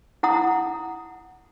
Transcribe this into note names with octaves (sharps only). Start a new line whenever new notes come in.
E4 F#5 A#5 D#6